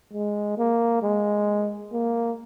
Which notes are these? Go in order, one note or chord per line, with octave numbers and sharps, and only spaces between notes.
G#3
A#3
G#3
A#3